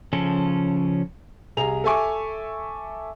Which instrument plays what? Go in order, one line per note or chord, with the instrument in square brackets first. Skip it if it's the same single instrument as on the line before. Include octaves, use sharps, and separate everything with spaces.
[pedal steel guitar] C#3 F3 C#4 A4
[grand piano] C2 G#4 A#5 F7
A4 E5 G#5 C#6 D6